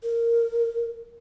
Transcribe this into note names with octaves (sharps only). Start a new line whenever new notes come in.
A#4